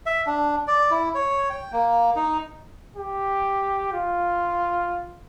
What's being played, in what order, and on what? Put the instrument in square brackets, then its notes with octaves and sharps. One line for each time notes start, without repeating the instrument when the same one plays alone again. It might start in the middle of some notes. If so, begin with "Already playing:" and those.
[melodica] E5
D4
D5
E4
C#5
G5
A#3
D#4
[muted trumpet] G4
F4